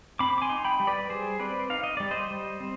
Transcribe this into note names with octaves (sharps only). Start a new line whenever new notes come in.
C4 B5 D6
D6
G#5 C6
D#4
G5 B5
G3
B4 D5
G3 G#4 C5
C4 B4 D5
D#4 F5
D#5
G3 D5
C5 D#5
G3
C4